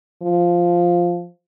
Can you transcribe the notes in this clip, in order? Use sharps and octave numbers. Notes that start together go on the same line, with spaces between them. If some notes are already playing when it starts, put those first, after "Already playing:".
F3